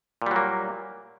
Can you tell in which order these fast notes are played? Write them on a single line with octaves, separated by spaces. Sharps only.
A#2 G3 F#3 A#3